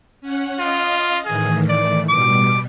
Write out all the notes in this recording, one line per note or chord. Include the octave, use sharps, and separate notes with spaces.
C#4 F#5
F4 D#5 F5 F6
A2 D#3 E3 G#4
D5
B2 G3 D6